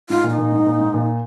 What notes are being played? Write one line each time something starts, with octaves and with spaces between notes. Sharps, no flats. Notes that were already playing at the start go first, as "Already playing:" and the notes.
G#2 F4
A#2
D#4
A#2
G#2
A#2
G#2
A#2